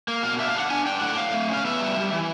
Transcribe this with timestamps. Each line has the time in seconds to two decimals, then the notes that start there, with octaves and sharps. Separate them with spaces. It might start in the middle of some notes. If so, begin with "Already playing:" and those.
0.08 A#3
0.23 B2 F5
0.39 D4 E5
0.49 F5
0.55 D4 F#5
0.70 D4 G#5
0.86 D4 G5
1.01 A2 F#5
1.17 A2 F5
1.33 A3
1.49 C#4 F5
1.65 B3 E5
1.81 G3
1.97 G3
2.12 E3